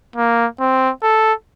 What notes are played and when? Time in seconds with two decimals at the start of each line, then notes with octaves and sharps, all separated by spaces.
0.16 A#3
0.60 C4
1.03 A4